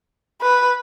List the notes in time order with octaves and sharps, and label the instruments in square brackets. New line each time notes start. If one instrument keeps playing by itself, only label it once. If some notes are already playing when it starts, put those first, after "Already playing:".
[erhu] B4